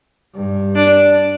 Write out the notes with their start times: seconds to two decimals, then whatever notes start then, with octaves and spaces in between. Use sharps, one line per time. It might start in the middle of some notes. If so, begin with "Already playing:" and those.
0.34 G2
0.75 D4